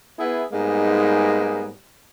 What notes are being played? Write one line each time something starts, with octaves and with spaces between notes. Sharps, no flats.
B3 E4 G#4
G#2 G3 G#3 A#3 B3 D#4